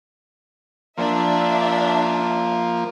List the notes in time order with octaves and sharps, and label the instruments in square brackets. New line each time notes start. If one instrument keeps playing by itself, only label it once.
[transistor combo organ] F3 A#3 [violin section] D4 E5